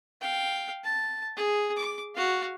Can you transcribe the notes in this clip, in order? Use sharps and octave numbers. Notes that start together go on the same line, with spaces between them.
F5 G5
A5
G#4
D6
F#4 F5